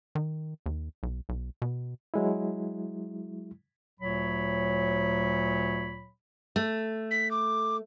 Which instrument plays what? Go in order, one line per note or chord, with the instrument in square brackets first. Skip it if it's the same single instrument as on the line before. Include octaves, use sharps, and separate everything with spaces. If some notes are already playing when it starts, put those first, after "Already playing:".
[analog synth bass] D#3
D#2
B1
B1
B2
[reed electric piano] F#3 G#3 E4
[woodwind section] D2 A#2 F#3 C#5 B5
[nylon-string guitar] A3
[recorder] B6
D6